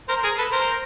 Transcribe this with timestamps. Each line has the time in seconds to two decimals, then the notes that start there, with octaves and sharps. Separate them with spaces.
0.09 A#4 C5
0.23 G#4 A#4
0.38 A4 B4
0.52 A#4 C5